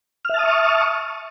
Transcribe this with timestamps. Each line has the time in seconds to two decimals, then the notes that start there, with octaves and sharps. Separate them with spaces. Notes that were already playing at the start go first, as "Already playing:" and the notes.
0.25 F6
0.29 E5
0.34 A5
0.39 D#6
0.43 C#6